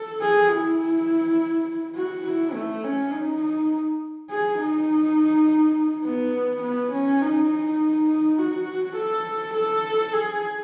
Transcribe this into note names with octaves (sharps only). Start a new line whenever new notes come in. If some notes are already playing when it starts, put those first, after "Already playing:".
Already playing: A4
G#4
E4
F#4
E4
A3
C#4
D#4
D#4
G#4
D#4
B3
B3
C#4
D#4
D#4
F#4
A4
A4
G#4